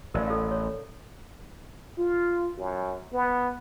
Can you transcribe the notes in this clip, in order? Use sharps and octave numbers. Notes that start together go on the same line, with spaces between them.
A1 A#4 D5 F5
A4 F5
C#5
F4
F#2
B3